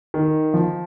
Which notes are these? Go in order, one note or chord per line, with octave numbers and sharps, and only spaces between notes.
D#3
F3